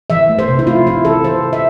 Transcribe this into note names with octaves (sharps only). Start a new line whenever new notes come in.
E3 E5
A3
C5
C3
E4
A3 F4
C3 E4
E3 A4
E3 C5
E3
E5